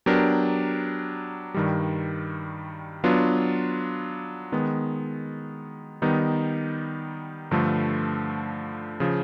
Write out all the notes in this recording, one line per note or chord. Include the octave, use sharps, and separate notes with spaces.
F#3 B3 D4 G4 A#4
G2 D#3 G3
F#3 B3 D4 F4
D#3 G#3 B3
D#3 G3 B3 D#4
G2 D3 F3 A3
C#3 F3